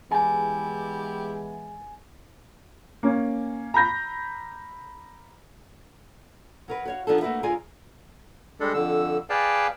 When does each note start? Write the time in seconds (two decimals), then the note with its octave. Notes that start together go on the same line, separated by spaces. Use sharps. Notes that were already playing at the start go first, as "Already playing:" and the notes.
0.11 E3 G#3 B3 E4 G4 G#4 G#5 A5
3.03 A#3 C#4
3.74 A#5 B5 G6 A#6
6.68 F#3 A#4 B4
6.85 F#4 C#5 F5
7.07 F3 F#3 B3 D4 D#4 A4
7.21 A3 A#3 F#4 B4 E5
7.43 D2 F4 G#4 A#4 F5 G#5
8.60 G3 G#3 D4 A4
8.74 F2 D3 E6
9.30 G#4 B4 D5 F5 G5 A5